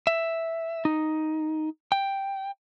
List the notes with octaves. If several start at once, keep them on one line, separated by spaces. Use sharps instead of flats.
E5
D#4
G5